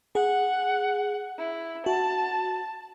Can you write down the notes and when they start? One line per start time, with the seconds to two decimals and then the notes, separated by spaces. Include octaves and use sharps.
0.15 G#4 F#5
1.38 E4
1.86 F#4 A5